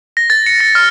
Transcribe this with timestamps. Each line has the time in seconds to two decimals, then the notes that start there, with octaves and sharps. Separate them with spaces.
0.17 A#6
0.30 A6
0.46 C#7
0.60 A#6
0.75 F6